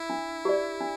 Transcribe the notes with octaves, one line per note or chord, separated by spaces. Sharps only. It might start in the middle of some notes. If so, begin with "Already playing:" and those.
Already playing: E4
D4
G4 D5
D4